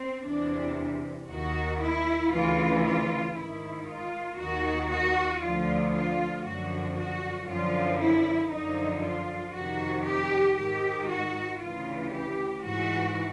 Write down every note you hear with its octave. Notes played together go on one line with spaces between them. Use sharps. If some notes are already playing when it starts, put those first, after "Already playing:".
Already playing: C4
E2 C3 E3 D4
D#2 D#3 F#4
E4
D2 C#3 E3 F4
F4
G#2 D#3 E4
F4
D#2 D#3 F#4
F#4
D2 D3 F3 F4
F4
F#2 D3 F3 F#4
F#4
F#2 D3 F3 F4
E4
F#2 D3 F3 D#4
F4
F2 C3 D#3 F#4
G4
G#2 D#3 G4
F#4
D2 C#3 E3 F4
G4
G#2 E3 F#4